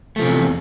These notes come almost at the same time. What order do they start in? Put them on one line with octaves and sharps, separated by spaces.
A3 F3 C3 E2